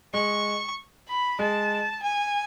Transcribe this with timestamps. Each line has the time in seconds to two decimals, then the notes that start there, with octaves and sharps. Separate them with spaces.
0.14 G#3 C#6
1.08 B5
1.39 G#3 A5
2.02 G#5